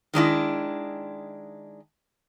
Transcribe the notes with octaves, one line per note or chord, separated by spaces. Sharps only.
D#3 G#3 D4 E4